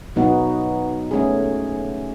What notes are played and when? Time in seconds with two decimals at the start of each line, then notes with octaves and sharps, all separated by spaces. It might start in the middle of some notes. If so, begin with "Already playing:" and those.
0.16 B2 F#3 B3 D#4 F#4
1.11 A3 C#4 G#4